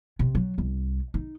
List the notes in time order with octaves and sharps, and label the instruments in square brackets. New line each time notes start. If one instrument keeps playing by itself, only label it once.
[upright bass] C3
F#3
C2
D#4